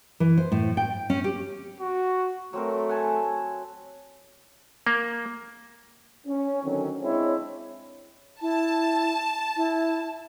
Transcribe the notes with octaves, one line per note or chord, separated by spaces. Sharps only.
E3
C5
A2
G5
C#4
G4
F#4
F#3 A3 C4 A#4
F#5 G#5 A5
A#3
C#4
D3 D#3 F#3 C4 C#4
G#3 C4 D4 E4 C#5
E4 A5
E4